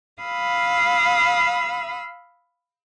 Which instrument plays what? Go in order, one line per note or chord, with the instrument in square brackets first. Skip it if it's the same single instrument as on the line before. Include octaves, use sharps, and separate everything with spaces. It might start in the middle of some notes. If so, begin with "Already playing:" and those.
[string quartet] F5 B5 D#6 E6